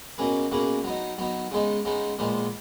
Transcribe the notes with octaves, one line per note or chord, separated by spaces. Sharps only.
B2 A#3 C#4 G#4 B4
B2 A#3 C#4 G#4 B4
F#3 B3 D#4
F#3 B3 D#4
C#3 G#3 B3 D#4
C#3 G#3 B3 D#4
A#2 F3 G#3 B3